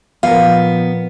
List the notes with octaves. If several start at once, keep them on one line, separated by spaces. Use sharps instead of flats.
A#2 F3 B3 A#4 F5